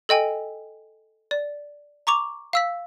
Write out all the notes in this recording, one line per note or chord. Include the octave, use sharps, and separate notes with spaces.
A4 D#5 G5 G#5
D5
A#5 C#6 D6 F7
F5 E6 B6